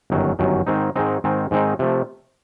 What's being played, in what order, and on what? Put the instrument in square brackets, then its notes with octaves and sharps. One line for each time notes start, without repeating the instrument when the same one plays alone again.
[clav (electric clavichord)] G1 F#2 D#3 F#3
G1 F#2 D#3 F#3
G#2 D#3 G#3 C4 D#4
G#2 D#3 G#3 C4 D#4
G#2 D#3 G#3 C4 D#4
G#2 D#3 G#3 C4 D#4
C3 F3 A3